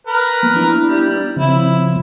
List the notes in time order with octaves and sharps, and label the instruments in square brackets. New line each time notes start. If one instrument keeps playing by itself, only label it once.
[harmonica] A#4 B4
[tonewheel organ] F3 A#3 B3
B3 D4 E4
[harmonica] G3
[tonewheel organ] C#3 F3 C4 [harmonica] E4